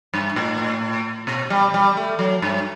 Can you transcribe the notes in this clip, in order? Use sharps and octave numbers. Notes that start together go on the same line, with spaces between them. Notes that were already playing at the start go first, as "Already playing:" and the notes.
G2
A2
B2
G3
G3
A3
F#3
G2